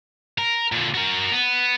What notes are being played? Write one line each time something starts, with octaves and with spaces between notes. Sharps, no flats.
A#4
A#2 D3
F#4 A#4
B3